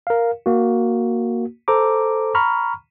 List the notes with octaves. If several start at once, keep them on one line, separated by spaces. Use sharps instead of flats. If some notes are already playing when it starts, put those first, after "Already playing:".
A#4 F5
A#3 F#4
A4 C5 A#5 D6
A#5 B5 C#6 F6